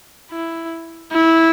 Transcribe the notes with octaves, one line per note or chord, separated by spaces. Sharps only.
E4
E4